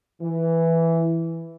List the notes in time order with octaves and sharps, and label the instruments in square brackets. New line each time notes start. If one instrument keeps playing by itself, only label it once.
[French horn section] E3